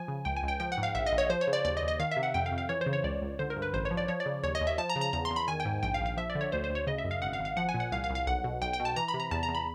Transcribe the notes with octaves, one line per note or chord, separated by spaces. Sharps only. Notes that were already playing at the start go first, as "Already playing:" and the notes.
Already playing: F3 G#5
C#3
C#2 G5
G#5
C#2
G5
F3 G5
F#5
G#2
F5
A#1 E5
D#5
A#1
C#5
F3 C5
C#5
C#3
D5
D#2 D5
D#5
D#2
D#5
D#3 F5
E5
C3
F#5
F2 G5
F5
F2
F5
E3 C#5
C5
C#3
C#5
C#2 D5
C#2
D3 C5
A#4
G2
B4
A1 C5
C#5
F3
D5
F3 C#5
D5
C#3
D#2 C#5
D#5
D#2
E5
F3 A5
A#5
C#3
A#5
E2 A#5
C6
E2
B5
D#3 G#5
G5
G#2
A#1 G5
F5
A#1
F5
F3 E5
D5
D3
C#5
D2 C5
C5
D2
C#5
C#3 D#5
E5
F#2
F5
G#1 F#5
F5
G#1
F5
F3 F#5
G#5
A#2
F#5
C2 F5
F5
C2
F5
B1 F#5
B2
B1 G5
G5
B2
A5
E3 A#5
B5
C3
A#5
E2 A5
A#5
E2
B5